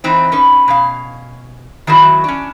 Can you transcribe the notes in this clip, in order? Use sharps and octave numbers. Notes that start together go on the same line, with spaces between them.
E3 C4 D#4
C#4 D#4 B4
B2 C#4 F5
D#3 F#3 E4 F#4
C#4 D4